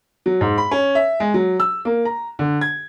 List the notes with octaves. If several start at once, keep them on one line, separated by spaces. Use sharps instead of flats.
F#3
G#2
B5
C#4
E5
G#3
F#3
E6
A#3
A#5
D3
G#6